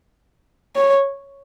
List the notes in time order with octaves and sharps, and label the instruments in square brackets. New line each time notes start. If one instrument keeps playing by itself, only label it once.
[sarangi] C#5